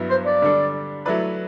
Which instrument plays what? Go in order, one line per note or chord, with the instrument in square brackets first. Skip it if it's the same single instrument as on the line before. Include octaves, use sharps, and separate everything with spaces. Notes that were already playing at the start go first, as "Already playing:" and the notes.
Already playing: [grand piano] G2 F#3 B3 E4
[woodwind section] C5
D5
[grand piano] D3 G3 D4 A4
F#3 A3 E4 B4 D5